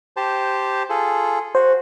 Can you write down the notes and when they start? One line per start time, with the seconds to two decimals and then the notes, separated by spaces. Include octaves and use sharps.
0.17 G4 C5 A5
0.89 F4 G#4 A4
1.55 F#4 C5